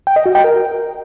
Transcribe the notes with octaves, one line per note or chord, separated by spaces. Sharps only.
G5
D#5
F#4
G5
A#4